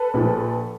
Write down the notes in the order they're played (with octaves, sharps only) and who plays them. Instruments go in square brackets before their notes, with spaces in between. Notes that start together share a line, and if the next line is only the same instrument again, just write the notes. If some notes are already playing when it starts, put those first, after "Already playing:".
Already playing: [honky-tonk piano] A4 B4
A#1 A#2 F3